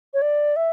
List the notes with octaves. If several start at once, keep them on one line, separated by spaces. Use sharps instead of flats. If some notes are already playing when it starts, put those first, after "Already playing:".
C#5
D5
E5